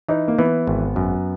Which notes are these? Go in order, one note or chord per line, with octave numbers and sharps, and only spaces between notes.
E3 D#4
A#3
E3 B3
G#1
F#2